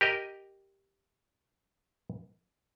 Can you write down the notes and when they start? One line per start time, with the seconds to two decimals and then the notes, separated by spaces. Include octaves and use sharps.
0.01 G4 A#4 D#5